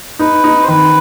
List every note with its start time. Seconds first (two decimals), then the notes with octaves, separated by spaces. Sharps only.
0.19 D#4 B4
0.44 D#4
0.63 C5
0.68 D#3 B4